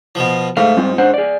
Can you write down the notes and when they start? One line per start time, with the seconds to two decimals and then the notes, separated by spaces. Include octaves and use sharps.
0.15 B2 F3
0.57 G#2 A3 F5
0.77 G3 C4 F4
0.98 D4 C5 F#5
1.14 G#4 D5